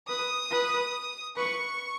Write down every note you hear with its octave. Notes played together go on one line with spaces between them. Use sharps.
B4 D#6
B4
B4 C#6